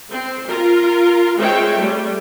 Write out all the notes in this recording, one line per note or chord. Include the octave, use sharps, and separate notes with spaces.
C4
F4 A#4
G#3 C4 C#5 E5 G5
G3 A3